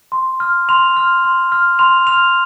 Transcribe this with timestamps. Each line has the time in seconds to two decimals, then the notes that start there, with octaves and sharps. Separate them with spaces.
0.12 C6
0.40 F6
0.69 C6 F7
0.97 F6
1.24 C6
1.52 F6
1.79 C6 F7
2.07 F6 F7